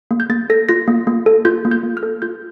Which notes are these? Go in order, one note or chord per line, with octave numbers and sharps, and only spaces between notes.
A#3
G6
A#3 A6
A4 A#6
F4 A#6
A#3
A#3
A4
F4 G6
A#3
G6
A#3
F6
A4
F4 G6